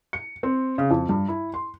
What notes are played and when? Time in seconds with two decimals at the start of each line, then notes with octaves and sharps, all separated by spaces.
0.13 C#7
0.43 C4
0.78 C#3
0.91 F2
1.09 G2
1.28 E4
1.54 C6